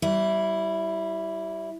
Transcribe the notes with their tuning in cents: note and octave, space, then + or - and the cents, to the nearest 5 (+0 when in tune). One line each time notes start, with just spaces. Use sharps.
G3 -25 E4 +0